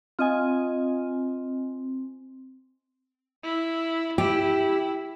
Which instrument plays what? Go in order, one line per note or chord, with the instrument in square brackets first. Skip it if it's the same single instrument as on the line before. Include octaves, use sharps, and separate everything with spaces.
[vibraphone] C4 [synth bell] F4 D#5 G#5
[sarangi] E4
[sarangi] E4 [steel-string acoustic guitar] G4